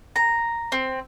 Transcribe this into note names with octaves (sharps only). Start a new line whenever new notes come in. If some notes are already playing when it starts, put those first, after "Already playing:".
A#5
C4